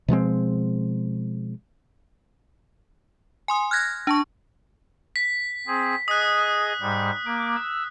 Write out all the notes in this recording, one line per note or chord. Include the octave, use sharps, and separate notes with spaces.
B2 F3 G#3 C4
G#5 C6 D#6
F6 F#6 G#6 A#6
D4 A5 C#6
B6
C4 G#4
G#4 D#5 D#6 F#6
G#2 G3
A#3 D6
E6